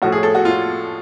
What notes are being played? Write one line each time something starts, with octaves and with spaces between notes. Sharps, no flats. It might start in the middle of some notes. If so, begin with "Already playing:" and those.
A2 F3 A3 C#4 F#4
G#4
A4
F#4
F4